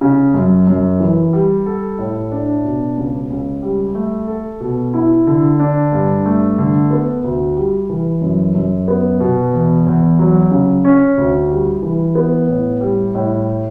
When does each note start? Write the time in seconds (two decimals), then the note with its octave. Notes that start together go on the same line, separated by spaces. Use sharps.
0.01 C#3
0.34 F#2
0.67 F#2
1.00 E3
1.33 G3
1.66 A4
1.98 A2
2.32 D4
2.64 B2
2.97 C#2
3.30 C#2
3.63 G3
3.95 A3
4.28 A4
4.60 B2
4.93 E4
5.27 D3
5.60 D4
5.92 G2
6.26 A3
6.58 D3
6.91 B3
7.24 D2
7.56 G3
7.89 E3
8.21 F#2
8.55 F#2
8.88 B3
9.20 B2
9.53 E2
9.87 E2
10.19 F#3
10.51 C#3
10.85 C#4
11.17 D2
11.51 G3
11.82 E3
12.15 B3
12.48 A2
12.81 G3
13.15 A2